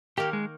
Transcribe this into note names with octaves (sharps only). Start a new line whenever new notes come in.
D#3 A#3 D#4 G4 A#4
G#3